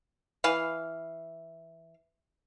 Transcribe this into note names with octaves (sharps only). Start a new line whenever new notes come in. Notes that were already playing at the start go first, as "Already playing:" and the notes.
E3 F5